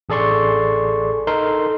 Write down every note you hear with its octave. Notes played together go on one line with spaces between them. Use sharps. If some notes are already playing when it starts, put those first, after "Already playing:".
A1 G#4 A4 D5 C6 C#6
D#4 A4 A#4 C6